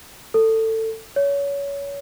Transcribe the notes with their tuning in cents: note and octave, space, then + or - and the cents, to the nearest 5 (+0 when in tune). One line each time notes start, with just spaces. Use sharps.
A4 +20
C#5 +25